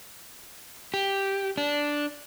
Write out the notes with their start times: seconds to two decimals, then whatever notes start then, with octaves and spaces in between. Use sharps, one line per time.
0.94 G4
1.57 D4